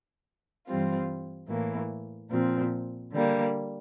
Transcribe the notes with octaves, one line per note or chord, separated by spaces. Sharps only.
G2 E3 G3 C4 F4
A2 E3 A#3
A#2 F3 C4
D3 G3 A#3